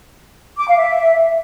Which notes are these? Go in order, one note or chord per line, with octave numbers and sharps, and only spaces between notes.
D6
F5
E5